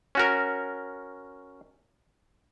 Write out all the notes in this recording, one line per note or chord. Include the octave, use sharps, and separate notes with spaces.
C#4 F#4 A#4